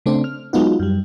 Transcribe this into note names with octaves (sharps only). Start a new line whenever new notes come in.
C#3 A3 C4 D4
F6
F#3 G#3 B3 D#4 F4 F#4
F#2 G3